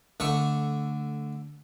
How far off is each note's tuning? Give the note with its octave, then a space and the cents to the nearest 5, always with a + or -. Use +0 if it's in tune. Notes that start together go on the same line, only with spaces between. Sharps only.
D3 -10 A3 +0 C#6 +0